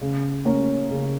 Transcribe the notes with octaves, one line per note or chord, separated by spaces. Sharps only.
C#3
A#3 C#4
C#3